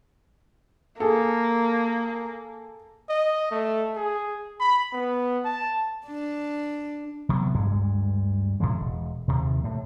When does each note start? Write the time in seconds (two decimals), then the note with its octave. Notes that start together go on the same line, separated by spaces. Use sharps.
1.00 A#3 G#4 A4
3.09 D#5
3.51 A3
3.96 G#4
4.60 B5
4.93 B3
5.45 A5
6.06 D4
7.29 C3 F#3 G3 B3
7.54 D2 G2 G#3
8.60 A2 C3 F3 G#3
8.79 E1
9.28 D#2 C3
9.64 A2